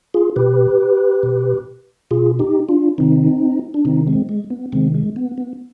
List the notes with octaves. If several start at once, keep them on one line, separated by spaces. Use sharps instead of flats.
F4 G#4
B2 G4 B4
B2
B2 F4 G#4
D#4 G4
D4 F4
C3 D#3 C4 D#4
D4
C3 D#3 C4 D#4
G#3 C4
G#3
B3
C3 D#3 G#3 C4
G#3
B3
B3